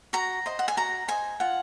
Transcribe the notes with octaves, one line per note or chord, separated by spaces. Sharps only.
F#4 A#5
C5 D#5
F#5
G#5
F#4 A#5
C5 D#5 G#5
F4 F#5